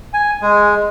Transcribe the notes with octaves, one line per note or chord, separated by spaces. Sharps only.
G#5
G#3